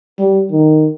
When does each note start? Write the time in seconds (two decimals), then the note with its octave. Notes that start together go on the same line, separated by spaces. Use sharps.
0.19 G3
0.52 D#3